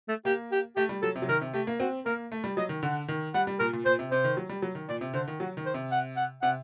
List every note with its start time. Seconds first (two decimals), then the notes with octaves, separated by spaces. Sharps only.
0.08 A3
0.25 A#3 G4
0.52 G4
0.76 A3 G4
0.89 G3
1.02 F#3 A4
1.16 C3
1.22 F#3
1.29 D#3 A#4
1.41 C3
1.54 A3 G4
1.67 A#3
1.80 C4 F#4
2.06 A#3 A#4
2.32 A3
2.44 G3
2.57 F#3 D#5
2.69 D#3
2.82 D3 F#5
3.08 D#3
3.34 G3 F#5
3.47 G3
3.59 A#2 A#4
3.73 A#2
3.85 A#2 C5
3.99 C3
4.11 C3 C5
4.24 D#3
4.37 F#3
4.49 G3
4.62 F#3
4.75 D#3
4.89 A#2 D5
5.01 C3
5.14 D3 C5
5.28 D#3
5.40 F#3 F#4
5.57 D#3
5.66 C5
5.74 C3
5.91 F#5
6.17 F#5
6.42 C3 F#5